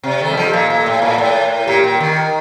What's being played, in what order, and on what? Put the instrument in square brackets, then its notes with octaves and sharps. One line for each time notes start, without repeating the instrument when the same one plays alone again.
[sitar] C3 [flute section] D5
[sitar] D#3 [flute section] A4
[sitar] G3
[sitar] F3 [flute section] A4
[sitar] A#2 [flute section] F5
[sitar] A#2 [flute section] A4
[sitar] A2 [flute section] F5
[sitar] A#2 [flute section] A4
[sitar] A2 [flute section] D5
[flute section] A#4
A#4
[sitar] A#2 [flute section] G4
[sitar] A#2 [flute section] G5
[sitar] D#3 [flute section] A#4
[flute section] G5